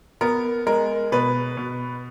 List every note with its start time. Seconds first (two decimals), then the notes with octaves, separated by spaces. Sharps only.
0.21 B3 A#4
0.66 G#3 A#4
1.12 B2 B4
1.57 B2